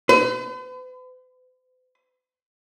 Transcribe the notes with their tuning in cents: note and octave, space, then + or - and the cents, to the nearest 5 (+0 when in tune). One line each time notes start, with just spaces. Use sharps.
B4 +45